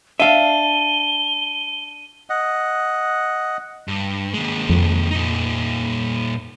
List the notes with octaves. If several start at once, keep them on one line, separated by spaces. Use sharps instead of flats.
D4 E5 F5 D#7 G7
D#5 F#5
G2
D#2 G#3
F2
A#2 D#4